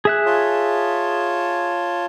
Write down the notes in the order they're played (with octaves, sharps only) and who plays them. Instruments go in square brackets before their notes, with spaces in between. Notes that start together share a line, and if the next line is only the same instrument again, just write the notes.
[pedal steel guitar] G#4 E5 F#6
[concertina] F4 C#5 A5